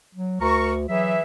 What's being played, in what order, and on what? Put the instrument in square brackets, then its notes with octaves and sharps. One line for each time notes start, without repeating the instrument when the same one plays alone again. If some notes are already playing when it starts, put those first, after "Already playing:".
[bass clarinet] F#3
[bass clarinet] D2 [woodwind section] A#4 A#5 C#6
[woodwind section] E3 G#4 E5 [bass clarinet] F#3